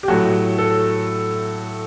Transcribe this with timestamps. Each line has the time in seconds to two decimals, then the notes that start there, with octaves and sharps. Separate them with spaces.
0.03 G4
0.08 A2 F#3 A3 F#4
0.58 A4